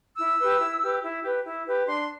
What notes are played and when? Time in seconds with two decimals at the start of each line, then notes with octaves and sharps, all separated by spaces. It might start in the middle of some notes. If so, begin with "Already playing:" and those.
0.18 E4 E6
0.39 G4 B4
0.60 E4
0.81 G4 B4
1.02 E4
1.23 G4 B4
1.45 E4
1.66 G4 B4
1.87 D4 C6